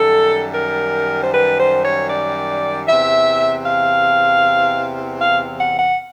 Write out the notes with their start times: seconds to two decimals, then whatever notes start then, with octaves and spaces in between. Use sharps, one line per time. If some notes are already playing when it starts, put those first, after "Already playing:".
Already playing: F#2 D#3 G3 A4
0.55 A#4
1.23 C5
1.33 B4
1.59 C5
1.84 C#5
2.10 D5
2.87 E2 C3 E3 E5
3.65 F5
5.20 F5
5.58 F#5
5.78 F#5